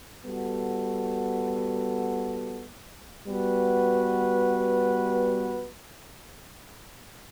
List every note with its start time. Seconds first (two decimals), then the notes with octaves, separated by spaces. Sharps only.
0.25 G3 B3 F#4 A4
3.27 G3 B3 F#4 B4